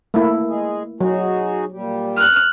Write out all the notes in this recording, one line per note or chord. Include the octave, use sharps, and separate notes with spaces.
A3 A#3 E4
G#3 G#4
F#3 D#4 F#4 G#4
A#2 G3 G4
F6 F#6